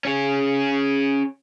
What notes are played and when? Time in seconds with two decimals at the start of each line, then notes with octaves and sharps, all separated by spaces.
0.05 C#4 G#4